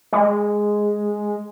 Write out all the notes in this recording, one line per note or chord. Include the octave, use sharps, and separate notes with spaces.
G#3